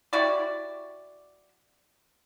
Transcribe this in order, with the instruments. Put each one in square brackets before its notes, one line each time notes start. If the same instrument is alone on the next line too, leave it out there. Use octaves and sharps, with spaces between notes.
[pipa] E4 F#4 G4 D5